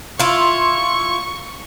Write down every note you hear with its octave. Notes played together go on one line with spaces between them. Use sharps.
E4 F4 C#6